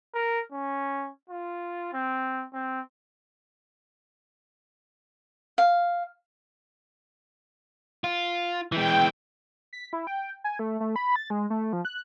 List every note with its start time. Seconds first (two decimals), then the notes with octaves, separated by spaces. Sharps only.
0.14 A#4
0.52 C#4
1.29 F4
1.93 C4
2.53 C4
5.58 F5
8.04 F4
8.72 E3 G#3 G5
9.73 B6
9.93 E4
10.07 G5
10.44 G#5
10.59 A3
10.80 A3
10.96 B5
11.16 A6
11.30 G#3
11.50 A3
11.73 F3
11.85 F#6